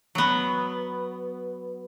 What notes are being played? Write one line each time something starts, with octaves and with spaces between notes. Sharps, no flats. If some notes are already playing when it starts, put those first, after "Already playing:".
F#3 B3